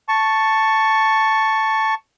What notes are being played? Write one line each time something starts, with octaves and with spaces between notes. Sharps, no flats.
A5 C#6